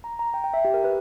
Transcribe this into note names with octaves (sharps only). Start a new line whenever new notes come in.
A#5
A#5
G5
G5
E5
G4
A#4
B4